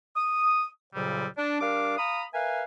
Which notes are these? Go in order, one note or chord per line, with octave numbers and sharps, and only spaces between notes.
D#6
F2 A#2 C#3 F#3 G3
D4
G3 D4 A#4 F5 D6
F5 A#5 B5 D#6
A#4 B4 E5 F5 G#5